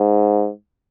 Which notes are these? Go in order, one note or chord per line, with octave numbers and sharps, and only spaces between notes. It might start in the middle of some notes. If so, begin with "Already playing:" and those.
Already playing: G#2